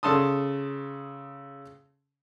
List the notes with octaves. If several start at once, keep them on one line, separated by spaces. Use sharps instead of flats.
C#3 A4 A5 C6 D#6